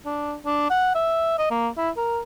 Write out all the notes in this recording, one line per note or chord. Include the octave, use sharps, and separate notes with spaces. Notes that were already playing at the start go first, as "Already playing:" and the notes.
D4
D4
F#5
E5
D#5
A#3
E4
A#4